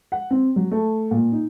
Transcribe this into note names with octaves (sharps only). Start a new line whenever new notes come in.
F#5
C4
F#3
A3
A#2
D#4